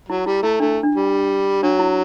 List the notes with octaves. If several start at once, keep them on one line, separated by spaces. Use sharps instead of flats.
F#3 E4
G3 E4
A3 E4
A3 D4
D4
G3
F#3 D4
E4